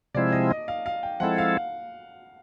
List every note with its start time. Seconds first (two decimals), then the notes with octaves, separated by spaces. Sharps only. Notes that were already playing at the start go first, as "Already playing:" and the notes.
0.15 C3 F3 G#3 C4 E4 D5
0.32 D#5
0.50 D#5
0.68 F5
0.86 F5
1.03 G5
1.20 F3 G#3 C4 E4 A4 F#5
1.38 F5